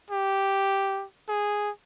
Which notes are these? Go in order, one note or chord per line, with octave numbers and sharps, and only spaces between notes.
G4
G#4